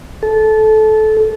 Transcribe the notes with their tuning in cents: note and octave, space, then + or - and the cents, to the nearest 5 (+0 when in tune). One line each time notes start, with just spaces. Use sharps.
A4 -20